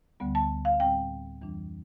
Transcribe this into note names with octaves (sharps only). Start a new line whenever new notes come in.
D2 D3 G3 B3
A5
F5
A2 G3 C4 G5
F2 E3 G3 D4